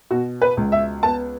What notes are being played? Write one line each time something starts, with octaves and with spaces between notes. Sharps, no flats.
B2 F#4
B4
C#2
E5
B3 A5